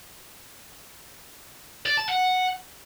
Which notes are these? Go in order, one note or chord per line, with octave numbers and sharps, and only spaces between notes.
D5
A5
F#5